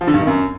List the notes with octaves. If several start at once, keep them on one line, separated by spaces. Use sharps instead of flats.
F3
D3
G2
D#3
F#2